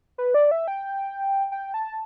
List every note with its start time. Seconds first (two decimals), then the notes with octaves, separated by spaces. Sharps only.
0.18 B4
0.34 D5
0.51 E5
0.68 G5
1.52 G5
1.74 A5